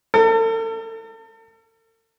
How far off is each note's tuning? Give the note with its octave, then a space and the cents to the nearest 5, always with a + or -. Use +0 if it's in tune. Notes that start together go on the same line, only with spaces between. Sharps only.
A4 +40